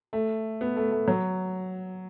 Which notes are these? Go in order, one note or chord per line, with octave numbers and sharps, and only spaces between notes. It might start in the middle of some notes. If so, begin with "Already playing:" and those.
A3
B3
A3
A3
F#3